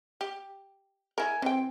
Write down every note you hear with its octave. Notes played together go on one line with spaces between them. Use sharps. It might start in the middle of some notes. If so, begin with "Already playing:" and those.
G4
E4 A#4 G#5
E3 C4 G5